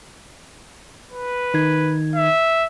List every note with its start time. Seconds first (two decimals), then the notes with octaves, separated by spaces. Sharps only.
1.12 B4
1.54 D#3 D#4 G#6
2.15 E5